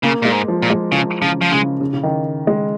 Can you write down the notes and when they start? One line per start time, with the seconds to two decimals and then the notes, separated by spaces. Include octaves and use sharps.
0.03 C#3 A#3
0.22 A#2 G#3
0.32 G#2
0.48 F3
0.62 A#2
0.70 G#3
0.92 C#3 F3
1.22 C#3 F3
1.41 F3
1.52 C#3 G#3
1.81 C#3
1.93 C#3
2.03 D#3
2.47 G#3